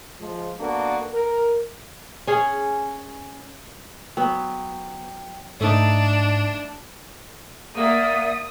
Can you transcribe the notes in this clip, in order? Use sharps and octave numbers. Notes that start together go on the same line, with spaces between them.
F3 G#3
A#3 B3 D4 F#4 A4
A#4
C#4 G#4
F#3 B3 G5
G#2 A3 D4 D#4 D5
A#3 D5 E5 F#5 D#6